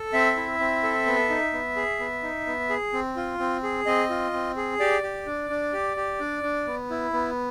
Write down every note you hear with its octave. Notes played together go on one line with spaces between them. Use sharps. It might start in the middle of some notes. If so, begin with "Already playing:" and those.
Already playing: A4
C4 E5
E4
C4
A4
B3
D#4
B3
G#4
B3
D#4
B3
G#4
C4
F4
C4
G#4
C4 D#5
F4
C4
G#4
G4 D5
G4
D4
D4
G4
G4
D4
D4
B3
E4
B3